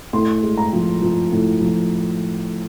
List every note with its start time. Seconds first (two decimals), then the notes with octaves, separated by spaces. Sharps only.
0.13 A2 C6
0.43 G#3
0.58 A#5
0.73 F3
1.01 F3
1.32 A2
1.61 F3